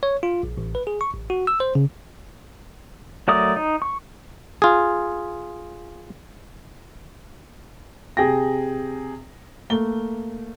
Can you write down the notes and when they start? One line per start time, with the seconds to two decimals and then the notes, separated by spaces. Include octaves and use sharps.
0.03 C#5
0.23 F4
0.43 A#1
0.57 A1
0.75 B4
0.87 G#4
1.01 C#6
1.14 A1
1.30 F#4
1.47 E6
1.60 C5
1.75 C#3
3.28 F#3 A3 A#4 D5 D#6
3.56 D#4
3.82 C#6
4.62 F4 G#4
8.17 C3 G#4 G5 A#6
9.70 A3 A#3 G7